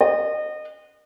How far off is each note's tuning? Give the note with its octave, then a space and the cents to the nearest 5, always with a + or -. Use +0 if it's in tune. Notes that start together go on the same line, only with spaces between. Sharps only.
D#5 -30